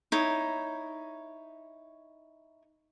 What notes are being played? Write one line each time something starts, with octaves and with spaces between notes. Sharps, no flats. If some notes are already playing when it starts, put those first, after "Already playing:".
D#4 E4 C#5